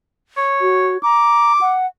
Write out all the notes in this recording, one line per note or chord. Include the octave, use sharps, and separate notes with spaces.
C#5
F#4
A#5 D6
F#5